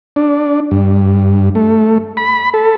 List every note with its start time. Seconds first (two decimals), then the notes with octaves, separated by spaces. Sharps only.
0.16 D4
0.71 G2
1.55 A3
2.17 B5
2.54 A4